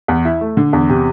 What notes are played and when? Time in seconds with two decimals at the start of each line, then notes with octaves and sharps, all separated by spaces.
0.08 E2
0.25 E4
0.41 A3
0.57 D3
0.73 E2
0.89 C3